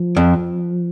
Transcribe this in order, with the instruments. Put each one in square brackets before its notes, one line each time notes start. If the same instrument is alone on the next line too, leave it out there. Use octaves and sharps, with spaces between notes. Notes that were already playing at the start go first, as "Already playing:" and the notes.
Already playing: [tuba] F3
[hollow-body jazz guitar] F2